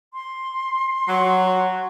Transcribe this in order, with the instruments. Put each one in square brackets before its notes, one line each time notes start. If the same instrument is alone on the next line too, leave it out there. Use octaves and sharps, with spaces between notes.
[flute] C6
[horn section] F#3
[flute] F#4